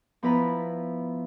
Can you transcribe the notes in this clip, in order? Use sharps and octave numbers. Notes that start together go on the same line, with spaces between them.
F3 B3 E4 B4 A#5 B5